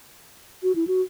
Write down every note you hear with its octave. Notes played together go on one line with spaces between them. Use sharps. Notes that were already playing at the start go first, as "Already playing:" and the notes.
F#4
E4
F#4